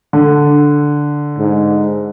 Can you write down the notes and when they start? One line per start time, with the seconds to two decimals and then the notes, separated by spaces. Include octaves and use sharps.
0.13 D3
1.39 G#2